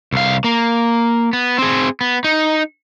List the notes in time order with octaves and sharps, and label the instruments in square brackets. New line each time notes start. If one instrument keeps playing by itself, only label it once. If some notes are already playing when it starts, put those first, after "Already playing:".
[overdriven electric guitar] C2 F5
A#3
B3
C4 G#4
B3
D#4